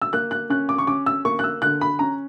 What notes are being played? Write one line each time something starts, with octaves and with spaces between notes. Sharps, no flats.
E6
A#3 F#6
F#6
C#4 F#6
D6
C#6
C#4 D6
E6
A#3 C#6
F#6
E6
D3 F#6
B5
C#4 A#5